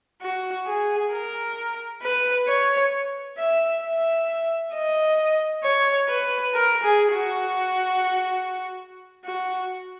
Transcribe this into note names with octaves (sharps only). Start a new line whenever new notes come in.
F#4
G#4
A#4
B4
C#5
E5
E5
D#5
C#5
B4
A#4
G#4
F#4
F#4